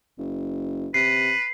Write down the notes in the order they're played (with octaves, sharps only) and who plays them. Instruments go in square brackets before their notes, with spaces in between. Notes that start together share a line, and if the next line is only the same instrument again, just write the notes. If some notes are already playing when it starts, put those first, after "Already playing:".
[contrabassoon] F#1
[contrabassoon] C3 [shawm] B4 [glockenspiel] C7